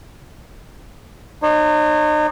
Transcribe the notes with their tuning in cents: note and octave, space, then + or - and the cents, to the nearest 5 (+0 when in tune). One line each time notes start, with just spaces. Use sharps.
D#4 -35 C#5 -25